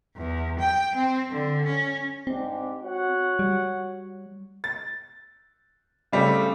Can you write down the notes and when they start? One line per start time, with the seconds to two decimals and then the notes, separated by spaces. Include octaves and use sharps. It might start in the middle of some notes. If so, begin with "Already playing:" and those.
0.16 E2
0.59 G5
0.95 C4
1.31 D3
1.65 C#4
2.27 G#2 C4 D4 G4
2.83 F#4 C#5 F#5
3.39 G3
4.64 A6
6.12 C#3 G3 A3 C4